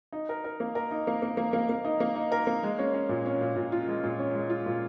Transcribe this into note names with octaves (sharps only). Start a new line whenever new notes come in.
D#4
A#4
A#4
A#3
A#4
D#4
A#3
A#3
A#3
A#3
A#3
D#4
A#3
D#4
A#4
A#3
G#3
C#4
C#4
A#2
C#4
A#2
A#2
F4
G#3
A#2
C#4
G#3
F4
A#2